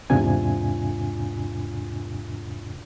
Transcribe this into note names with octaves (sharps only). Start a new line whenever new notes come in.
E2 G#2 C3 D4 F4 G#5